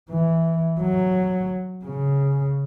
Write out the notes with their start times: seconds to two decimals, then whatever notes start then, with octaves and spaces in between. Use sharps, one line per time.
0.11 E3
0.81 F#3
1.85 C#3